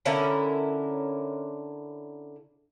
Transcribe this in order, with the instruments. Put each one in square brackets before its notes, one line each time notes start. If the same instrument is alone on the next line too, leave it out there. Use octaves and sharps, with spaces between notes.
[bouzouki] D3 C#4 E4 A#4